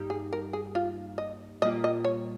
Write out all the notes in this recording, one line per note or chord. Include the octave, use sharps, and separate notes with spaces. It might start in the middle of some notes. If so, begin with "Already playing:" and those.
Already playing: G2 G3 A#3 D#4 G4
G#4
A#4
G#4
F4
D#5
A#2 G3 A#3 F4 D#5
D#5
C#5